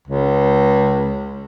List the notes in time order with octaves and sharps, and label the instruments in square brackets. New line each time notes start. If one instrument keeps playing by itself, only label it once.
[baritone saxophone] C#2